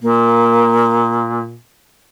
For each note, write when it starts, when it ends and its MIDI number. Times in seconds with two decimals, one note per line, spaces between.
0.02 1.56 46
0.02 1.39 58